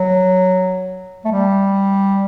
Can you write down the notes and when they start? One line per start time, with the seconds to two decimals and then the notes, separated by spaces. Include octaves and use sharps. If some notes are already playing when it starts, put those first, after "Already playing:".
Already playing: F#3
1.25 A3
1.31 G3